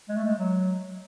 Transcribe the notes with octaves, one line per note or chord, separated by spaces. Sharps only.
G#3
A3
G#3
F#3